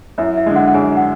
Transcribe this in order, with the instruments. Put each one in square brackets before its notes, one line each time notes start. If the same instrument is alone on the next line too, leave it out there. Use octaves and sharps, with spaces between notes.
[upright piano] F#2 [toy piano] E4 E5
[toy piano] E4 E5
[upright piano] D3 G#3
[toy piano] F#4 F#5
F#5
[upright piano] F#2 [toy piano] G#4 G#5
[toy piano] F#5